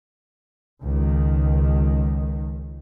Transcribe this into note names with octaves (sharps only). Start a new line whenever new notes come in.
C#2 D#3